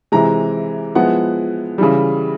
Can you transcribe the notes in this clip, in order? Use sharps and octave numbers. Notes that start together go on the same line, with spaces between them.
C3 E3 G#3 A#5
F3 G#3 B3 E4 F#5
C#3 E3 G3